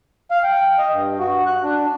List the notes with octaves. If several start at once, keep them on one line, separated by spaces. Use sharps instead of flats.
F5
G5
D#5
G2
F#4
F#6
D4